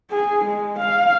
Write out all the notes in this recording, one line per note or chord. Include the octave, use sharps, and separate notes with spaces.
G#4
G#3
F5